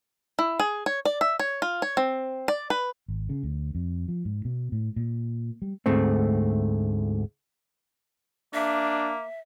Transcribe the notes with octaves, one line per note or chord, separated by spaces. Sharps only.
E4
G#4
C#5
D5
E5
C#5
F4
C#5
C4
D5
B4
G#1
C#3
D2
F2
F3
G#2
B2
A2
A#2
G3
D2 G#2 A3 C4
A#3 D4 E5